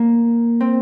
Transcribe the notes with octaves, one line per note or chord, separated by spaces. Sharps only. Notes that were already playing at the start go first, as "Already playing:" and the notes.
Already playing: A#3
C4